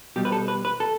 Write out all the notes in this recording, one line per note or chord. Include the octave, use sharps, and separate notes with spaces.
B2 G3 G4
B4
A4
B4
B4
A4